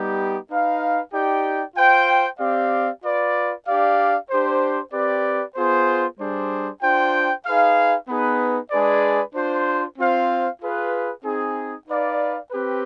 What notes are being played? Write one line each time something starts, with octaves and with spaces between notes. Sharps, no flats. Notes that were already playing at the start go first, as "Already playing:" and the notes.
Already playing: G3 B3 D#4 G4
D#4 B4 F5
D#4 G4 D5 G5
F4 C5 G5
C4 G4 D5 F5
F4 B4 D5
D4 G4 D5 F5
D4 G4 C5
C4 G4 B4 D5
B3 F4 G#4 C5
G3 D4 G#4 C5
D4 F4 C5 G5
D#4 G#4 B4 F5
B3 D#4 G#4 B4
G#3 D4 G#4 B4 D5
D4 F4 C5
C4 F4 C5 F5
F4 G#4 B4
C4 D#4 G#4
D#4 B4 D5 F5
C4 G4 B4